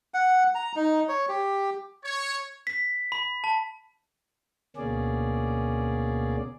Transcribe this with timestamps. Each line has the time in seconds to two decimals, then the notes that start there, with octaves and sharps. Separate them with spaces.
0.14 F#5
0.55 A#5
0.76 D#4
1.09 C#5
1.29 G4
2.05 C#5
2.67 B6
3.12 B5
3.44 A5
4.77 D2 B2 A#3 C#4 G#4 D5